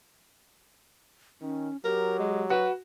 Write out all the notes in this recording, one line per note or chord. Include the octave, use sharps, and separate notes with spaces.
D#3 C#4
F#3 G4 A#4
G#3
F#4 B4